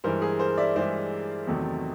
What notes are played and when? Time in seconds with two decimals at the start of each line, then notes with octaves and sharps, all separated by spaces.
0.04 G2 E3 G#3 A#4 C5
0.22 G#4 A#4
0.39 A#4 C5
0.58 D5 E5
0.75 G2 E3 G#3 C5 D5
1.47 E2 C3 D#3 F#3 A3